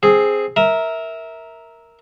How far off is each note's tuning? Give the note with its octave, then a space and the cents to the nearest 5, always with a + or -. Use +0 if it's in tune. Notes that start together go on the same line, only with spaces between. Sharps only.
C4 +0 G#4 +0
A#4 +0 E5 -15 A#5 +0